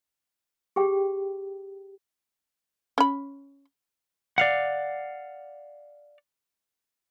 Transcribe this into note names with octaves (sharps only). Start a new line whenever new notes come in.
G4 G#4 G5
C#4 B5
D5 F5 F#5